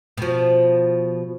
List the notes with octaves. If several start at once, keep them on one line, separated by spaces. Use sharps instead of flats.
B2 F3